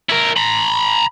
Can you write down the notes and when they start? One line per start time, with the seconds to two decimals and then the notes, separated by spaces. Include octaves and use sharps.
0.09 E4 A#4
0.37 A#5 B5